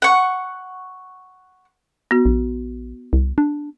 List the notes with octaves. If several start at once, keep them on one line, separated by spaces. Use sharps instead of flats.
F#5 C#6
B3 F#4
A#1
C2
D4